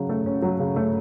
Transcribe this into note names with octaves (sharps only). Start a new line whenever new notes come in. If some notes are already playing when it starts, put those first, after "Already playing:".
Already playing: C#3 F#3
A3
C#4
F#3
C#3
A3